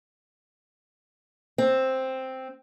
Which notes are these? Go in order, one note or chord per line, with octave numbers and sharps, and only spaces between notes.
C4